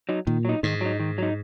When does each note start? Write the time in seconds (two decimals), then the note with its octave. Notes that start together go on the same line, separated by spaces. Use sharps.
0.09 F#3 D#4
0.27 A#2 D#3
0.45 F#3 D#4
0.63 G#2 D#3
0.81 F#3 D#4
1.00 D#3
1.18 F#3 D#4